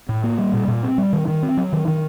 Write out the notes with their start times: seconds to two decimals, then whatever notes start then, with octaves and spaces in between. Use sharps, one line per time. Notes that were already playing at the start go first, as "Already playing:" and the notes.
0.09 A2
0.24 A#3
0.38 G3
0.53 A#2
0.68 A#2
0.83 C4
0.98 G3
1.13 D#3
1.28 D#3
1.43 C4
1.57 F#3
1.73 D#3
1.88 D#3